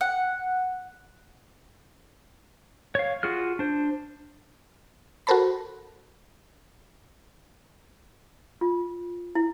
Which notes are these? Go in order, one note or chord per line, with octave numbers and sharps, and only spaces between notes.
F#5
C#5 F5
F4 F#4 G#4 F6
D4 C5
F#4 A4 A#4 C5 A5 B5
F4
E4